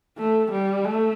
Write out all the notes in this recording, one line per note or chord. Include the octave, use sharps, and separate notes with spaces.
A3
G3
A3